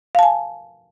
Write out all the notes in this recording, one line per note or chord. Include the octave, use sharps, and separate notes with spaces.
F5 G#5 A5